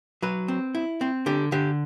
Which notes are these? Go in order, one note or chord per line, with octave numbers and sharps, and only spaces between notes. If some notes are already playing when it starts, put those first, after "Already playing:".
F#3 B4
C4
E4
C4
D3 G4
D3 G4